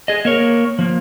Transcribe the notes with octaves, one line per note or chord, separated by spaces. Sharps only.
G#4 D#5
A#3 A#4 C#5
F3 A#3